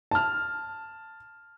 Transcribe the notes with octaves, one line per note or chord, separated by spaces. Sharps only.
A5 F6